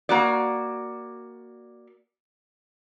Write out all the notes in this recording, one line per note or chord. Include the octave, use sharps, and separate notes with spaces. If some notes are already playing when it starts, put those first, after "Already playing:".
A#3 F#4 D5